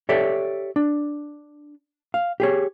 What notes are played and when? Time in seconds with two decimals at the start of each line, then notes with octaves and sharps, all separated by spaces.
0.09 G4 A4 C#5 D5 E5
0.76 D4
2.14 F5
2.40 G4 G#4 C#5